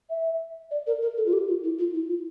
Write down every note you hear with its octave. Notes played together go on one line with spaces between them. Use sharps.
E5
D5
A#4
A#4
A4
F4
G4
F4
E4
F4
E4
F4